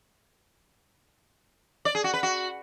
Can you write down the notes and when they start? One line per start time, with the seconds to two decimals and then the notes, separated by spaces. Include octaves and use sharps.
1.85 D5
1.95 G#4
2.04 F#4
2.14 B4
2.23 F#4